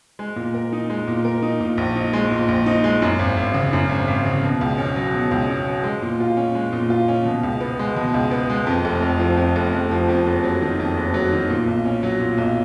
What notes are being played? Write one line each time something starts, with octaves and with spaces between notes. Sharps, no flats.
G#3
A#2
A#4
D#4
G#3
A#2
A#4
D#4
A#2
A#1
D#4
G#3
A#2
A#1
D#4
G#3
F#2
G#1
G#1
C#3
F#2
G#1
G#1
C#3
B2
C#2
C#4
F#3
B2
C#2
C#4
F#3
G#3
A#2
F4
C#4
G#3
A#2
F4
C#4
B2
C#2
B3
G#3
B2
C#2
B3
G#3
F2
F1
F1
F3
F2
F1
F1
F3
F2
F#1
F#3
D#3
F2
F#1
F#3
D#3
A#2
B1
C#4
F#3
A#2
B1